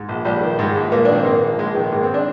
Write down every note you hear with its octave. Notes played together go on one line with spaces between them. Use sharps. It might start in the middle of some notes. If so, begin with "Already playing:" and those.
Already playing: G#2
A#1
A#1 G3
D#3
G#2 G#3
A#1
A#1 A#3
D#3 D4
C4
G#2 A#3
A#1
A#1 G#3
D#3
G#3
G#2 A#3
C4
D4